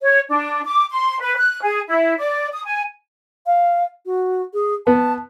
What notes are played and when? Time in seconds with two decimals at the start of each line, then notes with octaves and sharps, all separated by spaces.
0.02 C#5
0.29 D4
0.64 D6
0.90 C6
1.20 B4
1.36 F#6
1.62 G#4
1.88 E4
2.17 D5
2.53 D#6
2.65 G#5
3.46 F5
4.06 F#4
4.54 G#4
4.87 B3 A5